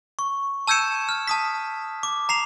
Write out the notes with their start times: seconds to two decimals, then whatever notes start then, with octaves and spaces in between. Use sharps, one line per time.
0.19 C#6
0.68 A5 E6 G6 G#6 C#7 E7
1.09 F6
1.28 A5 D#6 B6
2.03 D6
2.29 A#5 C7 F7